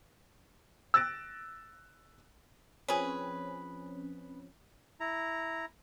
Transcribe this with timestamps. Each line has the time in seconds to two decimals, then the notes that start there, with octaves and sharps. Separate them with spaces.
0.94 E6 F#6 A6 A#6 D7
2.88 F3 C4 C#4 G#4 B4
5.00 E4 A#5